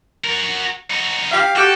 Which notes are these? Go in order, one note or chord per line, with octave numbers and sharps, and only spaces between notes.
F#4 A#4
D#4 F#4
G4 F5
F#4 G4 A4